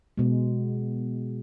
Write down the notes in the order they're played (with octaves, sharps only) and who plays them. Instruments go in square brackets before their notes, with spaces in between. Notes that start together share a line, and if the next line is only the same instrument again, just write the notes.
[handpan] B2 G#3